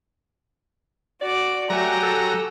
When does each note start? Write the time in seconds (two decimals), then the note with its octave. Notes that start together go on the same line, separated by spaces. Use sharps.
1.21 F#4 D5 D6
1.70 F#3 A3 G4 G#5 A#5
2.03 A4